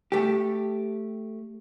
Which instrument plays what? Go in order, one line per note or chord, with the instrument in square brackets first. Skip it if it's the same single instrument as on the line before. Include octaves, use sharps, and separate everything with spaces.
[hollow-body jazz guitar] A3 G4